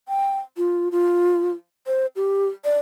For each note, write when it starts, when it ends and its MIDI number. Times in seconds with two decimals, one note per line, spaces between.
0.08 0.39 79
0.57 0.89 65
0.92 1.52 65
1.87 2.06 72
2.16 2.47 67
2.65 2.79 74